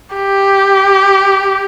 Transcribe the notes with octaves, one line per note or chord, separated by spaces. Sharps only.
G4